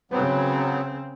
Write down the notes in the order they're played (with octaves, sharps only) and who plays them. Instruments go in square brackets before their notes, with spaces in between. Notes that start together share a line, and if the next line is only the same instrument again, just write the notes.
[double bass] C#3 C4 [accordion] F#3 B3